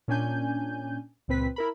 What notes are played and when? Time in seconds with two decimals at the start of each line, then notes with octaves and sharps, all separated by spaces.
0.08 A#2 C#4 D4 G#5 G6
1.28 C#2 A#2 C4 B4 B6
1.56 E4 A#4 B5